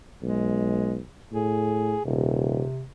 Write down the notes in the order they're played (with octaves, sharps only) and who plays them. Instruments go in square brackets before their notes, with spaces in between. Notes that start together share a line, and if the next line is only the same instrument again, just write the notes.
[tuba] B1 [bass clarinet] G#3
[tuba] A2 [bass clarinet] G#4
[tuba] D#1 [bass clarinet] C3